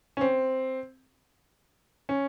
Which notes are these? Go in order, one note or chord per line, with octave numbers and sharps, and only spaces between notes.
C#4
C4
C#4